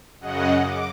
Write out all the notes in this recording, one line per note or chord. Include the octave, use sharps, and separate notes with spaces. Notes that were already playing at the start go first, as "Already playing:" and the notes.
F#2 C#3 D#5 F#5
D6